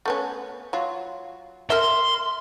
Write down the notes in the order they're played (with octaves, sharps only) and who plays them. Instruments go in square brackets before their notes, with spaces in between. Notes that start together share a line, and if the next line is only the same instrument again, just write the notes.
[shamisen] A3 B3 C#4
F#3 F4
[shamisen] A#4 E5 [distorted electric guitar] C6